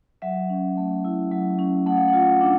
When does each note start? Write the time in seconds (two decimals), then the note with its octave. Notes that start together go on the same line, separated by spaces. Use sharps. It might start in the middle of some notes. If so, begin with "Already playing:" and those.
0.22 F#3 E5
0.50 C#4
0.77 A3
1.05 E4
1.31 F#3
1.59 C#4
1.86 A3 F#5
1.97 F5
2.08 F#5
2.13 F4
2.41 D4